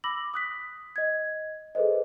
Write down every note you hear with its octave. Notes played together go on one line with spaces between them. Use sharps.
B5 D6 E6 A#6 F#7
D#6 F#6 B6
D#5 G#6
G#4 A4 B4 C5 D#5